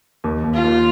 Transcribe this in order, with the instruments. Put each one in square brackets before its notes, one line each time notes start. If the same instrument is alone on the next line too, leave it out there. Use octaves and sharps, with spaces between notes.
[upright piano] D#2
D#2
[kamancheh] F4
[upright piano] D#2